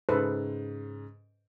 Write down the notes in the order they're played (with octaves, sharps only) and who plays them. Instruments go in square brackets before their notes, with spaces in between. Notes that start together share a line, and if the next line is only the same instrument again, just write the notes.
[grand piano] G#2 C#3 [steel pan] A4 B4 C5